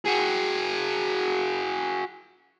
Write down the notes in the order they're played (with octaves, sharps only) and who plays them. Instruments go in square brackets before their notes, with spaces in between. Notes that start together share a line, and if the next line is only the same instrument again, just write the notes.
[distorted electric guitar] F#4 G#4